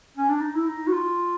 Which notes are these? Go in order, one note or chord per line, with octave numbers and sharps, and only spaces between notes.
C#4
D4
D#4
E4
D#4
F#4
F4